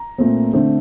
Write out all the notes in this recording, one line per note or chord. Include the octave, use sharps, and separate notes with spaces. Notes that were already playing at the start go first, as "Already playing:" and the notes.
Already playing: A#5
A#2 A3 C4
D3 A3 C4